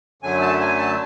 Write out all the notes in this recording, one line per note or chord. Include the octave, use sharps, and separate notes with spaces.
F#2 D3 F#3 A3 G#5
A5
G#5
A5